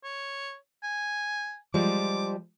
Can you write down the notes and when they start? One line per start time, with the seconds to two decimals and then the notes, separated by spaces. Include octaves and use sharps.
0.04 C#5
0.83 G#5
1.74 F3 G3 G#3 D6